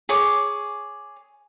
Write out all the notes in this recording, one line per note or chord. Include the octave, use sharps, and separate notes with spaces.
G#4 C#5 D6